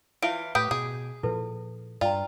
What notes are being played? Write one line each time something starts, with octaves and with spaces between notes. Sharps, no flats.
E3 E4 F4 C#5 D7
A2 G4 B4 D#6 G6 D7
B2 G#4
A#2 F3 E4 A4 B4
G2 F4 D5 G5 A#5